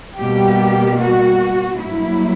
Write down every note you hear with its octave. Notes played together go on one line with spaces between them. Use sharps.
B2 G3 A#3 G4
F#4
G2 F#3 A#3 E4